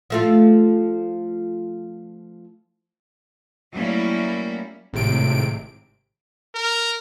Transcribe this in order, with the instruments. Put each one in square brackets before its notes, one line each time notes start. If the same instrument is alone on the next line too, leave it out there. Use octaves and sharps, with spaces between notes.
[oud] F3 A3 F4
[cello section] F#3 G3 A3 A#3 C#4 E4
[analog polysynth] G#1 A2 C3 D7
[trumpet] A#4